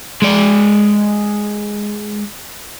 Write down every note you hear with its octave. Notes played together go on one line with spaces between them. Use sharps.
G#3 D5